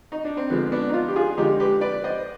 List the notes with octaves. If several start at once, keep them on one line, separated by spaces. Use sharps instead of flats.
D#4
D4
C4
D3 F3 G#3 B3
B3 D4
D#4
D4 F4
G4
F4 G#4
D3 F3 G#3 D#4 G4
G4 B4
B4 D5
C5 D#5